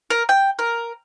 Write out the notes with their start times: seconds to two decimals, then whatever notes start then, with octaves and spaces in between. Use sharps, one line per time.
0.10 A#4
0.29 G5
0.59 A#4